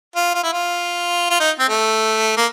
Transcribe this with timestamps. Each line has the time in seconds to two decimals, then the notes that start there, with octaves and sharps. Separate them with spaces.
0.16 F4
0.35 F4
0.43 E4
0.53 F4
1.30 F4
1.40 D#4
1.60 C4
1.69 A3
2.37 A#3